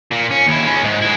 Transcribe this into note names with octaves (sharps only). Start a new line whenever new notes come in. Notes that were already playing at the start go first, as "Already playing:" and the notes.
A#2
C#4
D#2 E4
G#3 C#4
G#2
G#3 E4